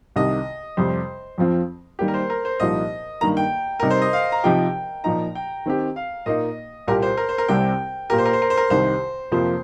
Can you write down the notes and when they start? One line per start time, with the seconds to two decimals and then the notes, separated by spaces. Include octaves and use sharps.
0.16 C2 C3 D#3 D#5
0.77 F2 C3 G3 C5
1.38 F2 F3 C4 F4
1.99 D#3 G3 A#3 G4
2.08 A#4
2.14 C5
2.30 A#4
2.45 C5
2.60 C2 A#2 F3 D#4 D#5
3.21 G2 D#3 A#3 A#5
3.37 G5
3.80 C3 G3 D#4 A#4
3.90 C5
4.02 D#5
4.13 F5
4.32 A#5
4.44 C3 F3 D#4 G4 G5
5.04 A#2 F3 D#4 A#5
5.35 G5
5.66 D#3 C4 G4
5.96 F5
6.26 A#2 A#3 D#4 D#5
6.88 C2 A#2 A#3 G4 A#4
7.02 C5
7.17 A#4
7.29 C5
7.38 A#4
7.48 C2 C3 G3 C4 G5
8.10 A#2 A#3 G4 A#4
8.18 C5
8.25 A#4
8.33 C5
8.42 A#4
8.50 C5
8.57 A#4
8.70 C2 C3 D#3 C5
9.32 F2 C3 F3 A#3 F4 C5